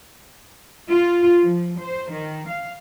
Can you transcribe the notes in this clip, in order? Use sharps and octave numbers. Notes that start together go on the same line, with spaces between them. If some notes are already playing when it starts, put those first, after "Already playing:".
F4
F3
C5
D#3
F5